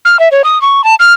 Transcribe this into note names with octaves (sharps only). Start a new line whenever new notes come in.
F6
E5
C#5
D#6
C#6
A5
F6